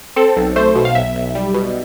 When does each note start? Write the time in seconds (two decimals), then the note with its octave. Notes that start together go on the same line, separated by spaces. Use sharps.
0.16 C4 A4
0.36 B1
0.56 A3 C5
0.75 B2
0.85 F5
0.95 B1 E5
1.15 B1
1.35 G3
1.54 B2